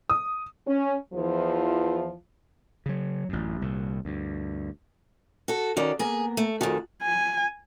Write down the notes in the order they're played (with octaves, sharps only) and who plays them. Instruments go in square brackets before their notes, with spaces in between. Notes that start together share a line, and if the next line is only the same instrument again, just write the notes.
[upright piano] D#6
[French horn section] C#4
E2 E3 F3
[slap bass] C#3 F#3
A1 F#2
C2 A#2
D2 G2
[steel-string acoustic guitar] F#4 A4
[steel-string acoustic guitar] D#3 C#4 [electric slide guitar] F#4 D5
[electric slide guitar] A#3 B3 A#4 [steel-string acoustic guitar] G#4
[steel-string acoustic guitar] A3
[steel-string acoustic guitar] F2 D#3 [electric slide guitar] F#4 G#4 A4
[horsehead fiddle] G#5